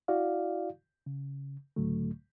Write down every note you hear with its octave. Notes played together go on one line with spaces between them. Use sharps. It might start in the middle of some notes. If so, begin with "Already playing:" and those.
E4 F#4 D5 F5
C#3
C#2 A2 D3 F#3 A3